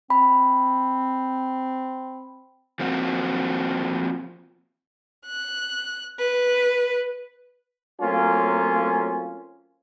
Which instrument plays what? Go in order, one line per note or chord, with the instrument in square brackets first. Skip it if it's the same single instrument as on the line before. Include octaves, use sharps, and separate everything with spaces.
[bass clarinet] C4 [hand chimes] B5
[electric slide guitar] F3 A#3 C4 F#4
[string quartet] F#6
B4
[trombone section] F#3 A3 A#3 C4 C#4 F4